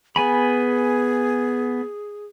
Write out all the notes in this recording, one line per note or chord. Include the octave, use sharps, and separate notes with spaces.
B3 G#4 G#5 B5